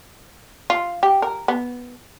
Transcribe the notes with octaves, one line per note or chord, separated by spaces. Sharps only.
F4
G4
A#4
B3